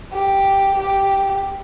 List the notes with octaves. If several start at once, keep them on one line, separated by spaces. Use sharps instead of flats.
G4
G4